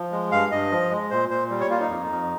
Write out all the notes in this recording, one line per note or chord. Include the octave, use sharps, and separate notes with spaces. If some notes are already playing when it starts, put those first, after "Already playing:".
Already playing: F3
G#3
G2 F5
G2 D#5
F3
G#3
A#2 C5
A#2 C5
G3
C#5
A#3 F4
D#4
F2
F2